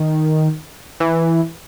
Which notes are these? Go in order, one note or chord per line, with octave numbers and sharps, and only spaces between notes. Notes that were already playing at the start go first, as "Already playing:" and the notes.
Already playing: D#3
E3